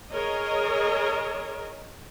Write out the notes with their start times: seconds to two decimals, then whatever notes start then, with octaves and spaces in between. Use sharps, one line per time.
0.12 G#4 A#4 C#5 D#5